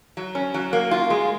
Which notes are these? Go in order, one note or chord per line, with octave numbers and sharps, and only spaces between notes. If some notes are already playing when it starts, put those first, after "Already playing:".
F#3
C#4
F#3
A#3
F4
G#3